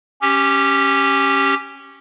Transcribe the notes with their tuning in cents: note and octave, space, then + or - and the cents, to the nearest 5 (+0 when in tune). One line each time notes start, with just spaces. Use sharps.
C#4 -10 G4 +0